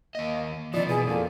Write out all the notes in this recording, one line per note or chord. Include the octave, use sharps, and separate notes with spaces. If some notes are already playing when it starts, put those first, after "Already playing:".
D#2 A#3 D#5
C3 E3 F3 D5 D#5
B2 G#4 B4 D#6
F2 A#3 A4 D5